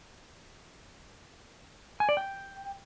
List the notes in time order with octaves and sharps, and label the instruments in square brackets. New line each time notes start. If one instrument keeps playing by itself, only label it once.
[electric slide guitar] G#5
D5
G5